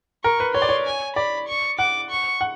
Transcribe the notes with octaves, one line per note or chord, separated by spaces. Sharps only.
A#4 C#6
B4
C#5 C6
D5
C#5
G#5
D5 B5
C#6
F#5 D6
C#6
F#5